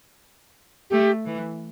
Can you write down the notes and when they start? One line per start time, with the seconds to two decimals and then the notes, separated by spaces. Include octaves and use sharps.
0.90 A3 G4
1.26 E3